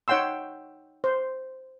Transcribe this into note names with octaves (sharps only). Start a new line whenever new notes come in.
D#4 C#5 F#5 G5 C6 E6
C5